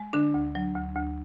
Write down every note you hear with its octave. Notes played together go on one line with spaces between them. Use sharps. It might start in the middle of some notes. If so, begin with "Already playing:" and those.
Already playing: G#3
D3 D4
D2
F#3
D2
D2